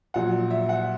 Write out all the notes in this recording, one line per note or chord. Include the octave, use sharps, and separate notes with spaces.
A#1 A#2 F#3 F#5
E5
F#5